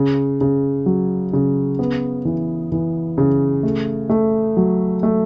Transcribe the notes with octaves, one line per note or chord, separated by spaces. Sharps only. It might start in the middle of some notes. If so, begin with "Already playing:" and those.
Already playing: C#3
C#3
F#3
C#3
B3
E3
E3
C#3
A3
A3
F#3
A3